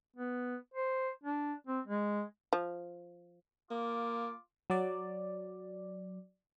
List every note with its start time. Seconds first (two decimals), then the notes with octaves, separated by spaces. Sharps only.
0.16 B3
0.74 C5
1.23 D4
1.67 C4
1.88 G#3
2.53 F3
3.71 A#3 F4 D6
4.70 F#3 D5